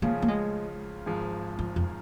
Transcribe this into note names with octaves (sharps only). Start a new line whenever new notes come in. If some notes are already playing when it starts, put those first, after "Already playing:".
C#2 C#3 F3 A#3 C#4
A#3
G#3
G#1 G#2 F3 G#3
F3
F2